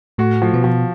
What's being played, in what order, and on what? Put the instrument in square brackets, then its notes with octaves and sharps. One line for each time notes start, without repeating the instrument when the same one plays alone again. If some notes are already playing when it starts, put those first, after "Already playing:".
[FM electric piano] A2 A3 [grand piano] F#4
[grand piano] F3 [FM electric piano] A3
[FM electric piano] B2 B3
[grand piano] F3